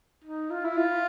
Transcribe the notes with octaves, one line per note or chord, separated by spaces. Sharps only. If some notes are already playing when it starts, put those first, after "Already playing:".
D#4
F4
E4
F4